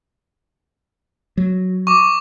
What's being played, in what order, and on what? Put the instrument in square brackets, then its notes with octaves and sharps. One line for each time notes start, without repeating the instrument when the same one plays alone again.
[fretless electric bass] F#3
[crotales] C#6 D6